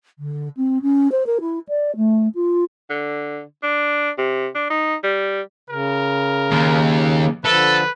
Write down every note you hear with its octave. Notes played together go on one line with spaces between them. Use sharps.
D3
C4
C#4
C5
A#4
E4
D5
A3
F4
D3
D4
C3
D4
D#4
G3
C#3 A#4
D#2
D3 F3 A4 B4